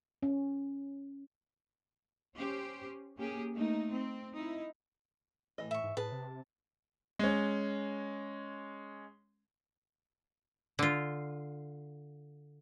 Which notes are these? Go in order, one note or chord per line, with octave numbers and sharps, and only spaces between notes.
C#4
C#4 G4 C5
A#3 C#4 G4 G#4
A3 A#3 D#4
C4
D#4 E4
A2 E3 D#5
A2 E5 C#6
G#2
A2 G#4 B4 A5
C3
G#3 C#4
D3 F4